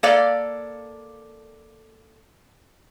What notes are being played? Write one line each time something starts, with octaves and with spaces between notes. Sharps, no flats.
A#3 A4 D5 F5